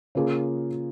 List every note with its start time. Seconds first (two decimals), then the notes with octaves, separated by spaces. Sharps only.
0.15 C#3 A#3 F4 G#4